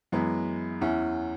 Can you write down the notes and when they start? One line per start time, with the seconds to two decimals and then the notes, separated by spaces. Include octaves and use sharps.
0.12 F#2 E3 G#3 B3
0.81 E2 E3 C#4 E4